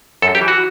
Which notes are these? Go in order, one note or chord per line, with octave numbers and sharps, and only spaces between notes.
F#2 A4
G4
E3
F#4